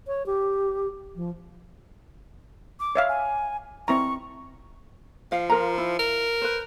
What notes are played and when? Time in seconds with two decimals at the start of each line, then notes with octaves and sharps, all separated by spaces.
0.07 C#5
0.26 G4
1.16 F3
2.80 D6
2.95 C#5 E5 F5
3.09 G#5
3.88 C4 E4 A#5 C#6
5.32 F3 F5
5.50 F4 A#4 A#5
5.78 E4
5.99 A#4
6.42 B4 C5